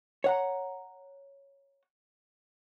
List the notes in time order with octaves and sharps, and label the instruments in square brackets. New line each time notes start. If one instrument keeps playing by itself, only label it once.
[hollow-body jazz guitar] C#5 F#5 A#5